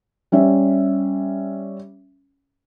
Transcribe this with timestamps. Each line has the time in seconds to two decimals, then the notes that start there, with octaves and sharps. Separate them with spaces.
0.32 G3 C#4 E5